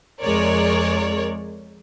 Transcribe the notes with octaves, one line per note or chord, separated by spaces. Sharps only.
F2 G#3 A#4 C#5 D5